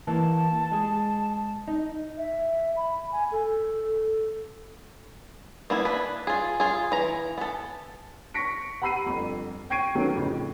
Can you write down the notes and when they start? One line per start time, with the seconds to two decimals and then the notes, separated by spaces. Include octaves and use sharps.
0.07 E3 A#3 A5
0.72 G#3 G#4
1.68 D#4
2.18 E5
2.77 B5
3.12 G#5
3.32 A4
5.70 A#3 B3 E4
5.85 D4 B4
6.27 F4 G#4
6.60 F4 G#4
6.92 E3 A#5
7.38 B3 A4
8.34 C#6 A#6 B6 C#7 D7
8.82 F#5 A#5 B5 E6 C7 D#7
9.06 G1 F2
9.70 G5 C#6 G#6 C7 D7 D#7
9.95 D#3 F#3 A3 B3 C#4
10.15 F2 A2 C#3